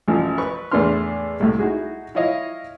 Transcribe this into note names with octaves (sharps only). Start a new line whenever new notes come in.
A1 F#2 F3
B4 C#6
E2 A2 B3 D4 C6 F6
C2 A2
D#4 E4 F#4 G#4
E4 F4 C#5 D#5 F5